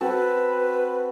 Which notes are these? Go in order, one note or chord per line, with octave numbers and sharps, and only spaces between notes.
C4 F#4 A4 B4